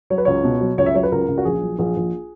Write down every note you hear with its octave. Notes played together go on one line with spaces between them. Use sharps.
F#3 C#5
B4
C#2 C#5
B2
F#3
C#2 C#5
E5
F#3 C#5
B4
C#2 A#4
C#2
F#4
A#1 G#4
F#3
A#1 G#4
A#1